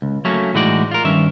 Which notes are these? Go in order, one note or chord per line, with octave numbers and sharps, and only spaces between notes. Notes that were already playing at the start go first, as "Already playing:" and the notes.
C#2
F#3 A3 A#3 C#4
A2 E3 G#3 D#4 F#4 D5
F4 A#4
G2 D#3 C#4 E5